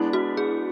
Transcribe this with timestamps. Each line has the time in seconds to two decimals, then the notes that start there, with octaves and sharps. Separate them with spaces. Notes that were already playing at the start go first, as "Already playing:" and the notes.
Already playing: G#3 B3 D4 E4
0.13 F#4
0.37 G#4